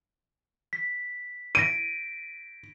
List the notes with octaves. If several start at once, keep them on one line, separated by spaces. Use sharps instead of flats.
B6
A#6 D7 D#7